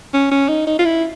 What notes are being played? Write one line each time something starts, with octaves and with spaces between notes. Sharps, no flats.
C#4
C#4
D#4
D#4
F4
E4